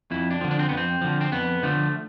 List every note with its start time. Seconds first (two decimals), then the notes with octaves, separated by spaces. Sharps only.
0.11 F2 E4
0.31 D4
0.41 D3 F3
0.51 D4
0.59 C4
0.69 F2 B3
0.77 C4
1.01 D3 F3
1.21 C4
1.32 F2 B3
1.63 D3 F3 A3